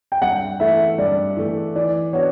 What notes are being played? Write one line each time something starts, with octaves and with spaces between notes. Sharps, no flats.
G5
G2 F#5
E3 A3 E5
G2 D5
E3 A3
E3 D5
B3 D4 F#4 C#5